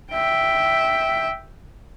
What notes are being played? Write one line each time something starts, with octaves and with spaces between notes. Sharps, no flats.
E5 G5